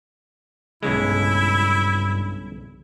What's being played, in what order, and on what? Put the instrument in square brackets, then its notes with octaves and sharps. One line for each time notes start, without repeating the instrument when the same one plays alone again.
[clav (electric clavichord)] B1 C#3 G#3 [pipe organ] G2 [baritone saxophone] E4